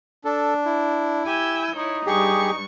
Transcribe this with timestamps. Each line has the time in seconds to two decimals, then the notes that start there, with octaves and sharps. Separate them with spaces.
0.25 D4 A4
0.65 E4
1.26 G4 G#5 E6 G6
1.76 D#4 E4 C#5
2.06 G2 G3 G4 G#4 C#6